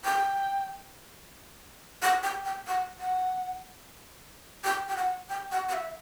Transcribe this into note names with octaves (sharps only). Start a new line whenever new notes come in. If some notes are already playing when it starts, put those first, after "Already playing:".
G5
F#5
G5
G5
F#5
F#5
G5
G5
F#5
G5
F#5
F#5
E5